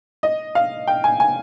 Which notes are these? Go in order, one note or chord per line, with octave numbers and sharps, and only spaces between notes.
D#5
F5
G5
G#5
G#5